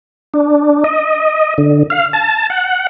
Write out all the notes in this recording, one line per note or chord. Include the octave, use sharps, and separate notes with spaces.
D4
D#5
D3
F5
A5
F#5